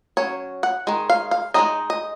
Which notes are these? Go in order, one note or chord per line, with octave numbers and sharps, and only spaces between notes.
F#3 C#4 C#5
F#5
D#3 G#3
F5
F5
G#3 C4 D#4 D#5
D#5